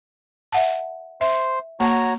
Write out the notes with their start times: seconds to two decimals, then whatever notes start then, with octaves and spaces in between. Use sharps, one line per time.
0.52 E5 F#5 A5
1.21 C5 E5
1.80 A#3 F#4 C#5 A5 A#5